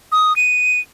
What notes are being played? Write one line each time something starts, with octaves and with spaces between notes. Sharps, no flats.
D#6
D#7